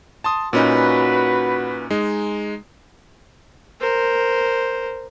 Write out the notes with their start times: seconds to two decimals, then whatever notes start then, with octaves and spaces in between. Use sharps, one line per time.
0.24 A5 C6 D#6
0.53 A#2 C#4 D#4 F#4 B4
1.90 G#3 D#4
3.80 A#4 C5